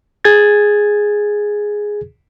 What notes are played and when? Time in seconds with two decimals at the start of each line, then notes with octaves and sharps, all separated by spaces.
0.25 G#4 G#6 A6